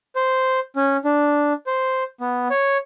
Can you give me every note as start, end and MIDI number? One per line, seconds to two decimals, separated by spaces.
0.16 0.60 72
0.76 0.97 61
1.04 1.53 62
1.66 2.04 72
2.20 2.48 59
2.50 2.78 73